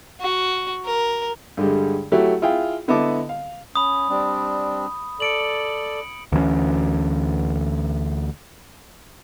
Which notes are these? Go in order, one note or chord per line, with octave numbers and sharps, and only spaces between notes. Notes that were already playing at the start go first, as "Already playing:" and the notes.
F#4
A#4
G2 D3 G3 G#3
F#3 A3 E4 F#4 G4
E4 F4 G#4 F5 G5
D3 B3 E4 D#5 A5 D6
F5
C#4 B5 D#6
G3 C4 D4
A4 D5 C#7 D7 F#7
D2 E3 G#3 C#4